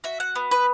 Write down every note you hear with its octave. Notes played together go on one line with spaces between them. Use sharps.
F#4 E5
F#5
B3
B4